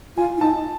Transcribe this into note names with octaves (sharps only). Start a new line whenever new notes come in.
F4 G#5
E4
D#4 A5